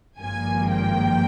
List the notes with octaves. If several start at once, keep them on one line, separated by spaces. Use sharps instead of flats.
G#1 G2 F3 A#3 G#5
G5